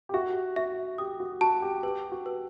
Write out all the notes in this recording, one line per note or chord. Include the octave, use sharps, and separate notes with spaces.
G4
F#4 E5
F#4 E5
G4 D#6
F#4
F#4 A5
G4
G4 B4
F#4
B4